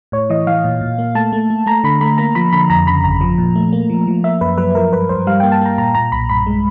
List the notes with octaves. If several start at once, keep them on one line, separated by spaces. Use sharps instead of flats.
A2 C#5
E3 D#5
E3 F5
A#2
A#2
A#3
A3 A5
A3
A3
A3 A#5
D3 B5
A3 B5
A#3 A#5
F3 B5
D3 B5
F2 A#5
C#3 B5
G1 A#5
F3
A#2
A3
A#3
F3
F3
A#3 E5
F#2 B4
F#3 B4
F3 A#4
G2 B4
G2 C5
G3 F5
A#3 G5
A5
A#3 A#5
A#2 A#5
A#2 A#5
B1 B5
G2 B5
G#3